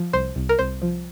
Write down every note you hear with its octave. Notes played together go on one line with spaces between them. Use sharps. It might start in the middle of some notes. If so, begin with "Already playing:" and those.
Already playing: F3
C2 C5
C2
A#4
C2 C5
F3